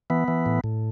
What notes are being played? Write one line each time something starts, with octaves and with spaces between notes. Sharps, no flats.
E3 B3
E3
A2
A2